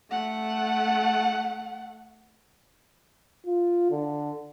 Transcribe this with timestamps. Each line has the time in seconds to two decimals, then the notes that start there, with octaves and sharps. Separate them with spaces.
0.11 A3 F#5
3.46 F4
3.91 D3